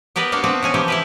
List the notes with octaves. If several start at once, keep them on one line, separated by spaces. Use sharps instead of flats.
B3 G4 A#4 B4 D5
A#3 D4 F#4 F5
B3 C4 D4
B2 C#4 G#5
C3 E3 F3 G4
E4 G4 B4